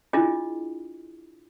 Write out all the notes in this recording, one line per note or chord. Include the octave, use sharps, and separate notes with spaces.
D4 E4 F4 G#4 D#5